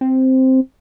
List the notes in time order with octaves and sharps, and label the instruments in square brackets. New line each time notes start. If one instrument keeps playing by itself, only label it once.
[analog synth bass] C4